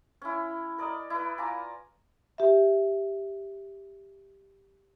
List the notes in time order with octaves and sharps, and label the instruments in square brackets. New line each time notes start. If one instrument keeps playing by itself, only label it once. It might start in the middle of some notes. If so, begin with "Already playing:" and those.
[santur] C#4 E4
A#4 D5 D#5
E4 B4
F4 G#5 A#5 D6
[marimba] G4 E5